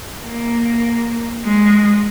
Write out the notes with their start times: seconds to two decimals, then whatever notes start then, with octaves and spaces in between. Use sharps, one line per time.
0.24 A#3
1.45 G#3